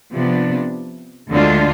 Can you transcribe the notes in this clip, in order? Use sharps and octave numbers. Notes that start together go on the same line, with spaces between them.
C3 F3 B3 D4
D2 D3 G#3 D4 F4